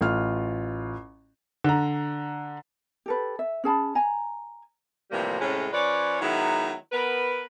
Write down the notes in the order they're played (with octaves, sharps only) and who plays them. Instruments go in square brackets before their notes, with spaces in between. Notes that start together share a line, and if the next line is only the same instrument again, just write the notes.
[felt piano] A1 F4 F6
[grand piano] D3 A#5
[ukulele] G4 A4 B4
E5
C#4 G#4 A5 B5
G#5 A#5
[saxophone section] A2 C3 E3 F3 G3 A#3
A2 C3 G#3 A3 C#4
F3 C#4 B4 C#5 D5
D#3 F#3 G#3 B3 E4
B3 A#4 B4